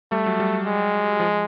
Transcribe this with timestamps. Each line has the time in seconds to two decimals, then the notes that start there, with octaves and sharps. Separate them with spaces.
0.12 G3 A3
0.26 F#3
0.40 G3
0.66 G#3
1.20 F3